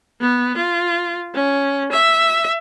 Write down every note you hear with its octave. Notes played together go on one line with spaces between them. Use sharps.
B3
F4
C#4
E5